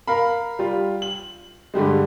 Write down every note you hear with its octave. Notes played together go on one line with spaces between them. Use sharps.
A#4 F5 B5
G3 F4
F#7
G2 D3 G3 G#3